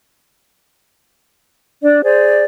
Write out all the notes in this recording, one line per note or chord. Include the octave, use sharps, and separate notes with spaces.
D4 D5
G#4 C5 D5